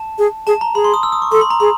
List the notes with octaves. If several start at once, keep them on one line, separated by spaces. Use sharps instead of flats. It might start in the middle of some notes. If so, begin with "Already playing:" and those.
Already playing: A5
G#4
G#4 A5
A#5
G#4 B5
C6
D#6
E6
D#6
C#6
A4 C6
B5
A#5
G#4 B5